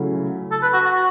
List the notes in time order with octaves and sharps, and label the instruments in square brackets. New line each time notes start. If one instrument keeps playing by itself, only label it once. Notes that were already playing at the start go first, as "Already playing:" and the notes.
Already playing: [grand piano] C#3 F#3 A3 E4
[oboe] A4
B4
F#4
F#4